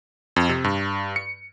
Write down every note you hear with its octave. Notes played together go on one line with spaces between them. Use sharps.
F2
C3
G2
C#7